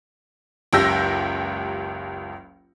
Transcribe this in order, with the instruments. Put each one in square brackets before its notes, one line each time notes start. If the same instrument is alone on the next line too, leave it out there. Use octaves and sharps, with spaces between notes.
[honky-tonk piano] F#1 C#2 G4 E6 G6 A#6